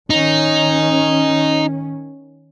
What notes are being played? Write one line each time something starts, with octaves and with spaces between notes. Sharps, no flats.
D#3 C#4 D#4